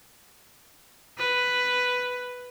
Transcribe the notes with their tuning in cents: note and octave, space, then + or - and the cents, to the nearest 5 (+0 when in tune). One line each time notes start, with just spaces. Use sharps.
B4 +5